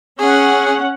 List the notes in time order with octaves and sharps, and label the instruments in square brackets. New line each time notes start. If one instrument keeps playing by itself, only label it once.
[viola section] C#4 F#5 [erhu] G#4